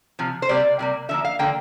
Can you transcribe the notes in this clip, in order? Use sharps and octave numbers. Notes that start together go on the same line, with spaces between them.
C3 F3
C5
C3 G3 A#3 D5
C3 G3 A#3
D3 F3 A#3 E5
F5
D3 F3 A#3 G5